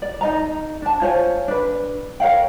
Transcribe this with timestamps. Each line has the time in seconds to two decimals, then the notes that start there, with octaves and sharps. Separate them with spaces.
0.02 D5
0.21 D#4 D#5 A#5
0.82 D4 A5
1.01 F4 C5 C#5 G#5
1.48 D4 B4
2.20 A#4 C#5 F5 G5